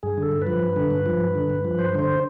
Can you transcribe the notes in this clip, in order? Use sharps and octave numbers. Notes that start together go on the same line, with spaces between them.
G2 G#4
D3 A4
G2
B4
F3
G2
D3
G2
F3
G2
D3
G2
F3
G2 C5
D3 C5